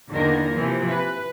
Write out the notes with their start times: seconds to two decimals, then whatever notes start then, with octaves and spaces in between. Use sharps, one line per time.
0.11 E2 D3 D#3 A#3 A#4
0.53 C3 E3 F3
0.89 B4